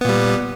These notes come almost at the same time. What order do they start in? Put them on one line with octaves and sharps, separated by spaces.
B3 A#2 G3